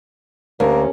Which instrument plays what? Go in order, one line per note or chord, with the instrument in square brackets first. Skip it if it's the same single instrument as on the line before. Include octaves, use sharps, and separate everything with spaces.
[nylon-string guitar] D2 [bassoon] A#3 [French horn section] C#4 G4 A#4